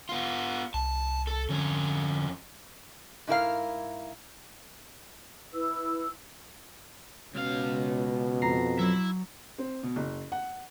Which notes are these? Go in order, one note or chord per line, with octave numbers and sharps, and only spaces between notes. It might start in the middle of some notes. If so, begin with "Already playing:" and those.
B3 F4
C2 A5
A4
F2 D3 C#4
G#2 E4 A#4 F5
E4 B4 E6
C#2 B2 C#4 F5
F2 A#5 C7
F#3 E4 E5
C4
B2
F#1
F#5